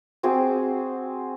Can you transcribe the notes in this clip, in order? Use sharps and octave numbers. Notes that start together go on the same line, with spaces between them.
C4 F#4 G#4 D6